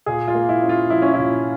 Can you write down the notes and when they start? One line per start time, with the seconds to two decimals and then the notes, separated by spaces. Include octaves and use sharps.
0.06 A#2 G#4
0.28 F4
0.35 A#3
0.49 E4
0.62 C#4
0.69 F4
0.90 F3 E4
1.02 C#4
1.14 A#2 E4